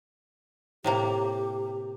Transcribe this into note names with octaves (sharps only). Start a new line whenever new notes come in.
A2 C3 A#3 G4